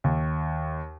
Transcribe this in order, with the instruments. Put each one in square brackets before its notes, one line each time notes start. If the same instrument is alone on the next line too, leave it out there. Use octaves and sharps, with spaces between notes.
[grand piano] D#2